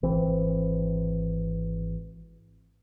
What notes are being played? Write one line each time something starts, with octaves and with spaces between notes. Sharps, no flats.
G#1 E3 C4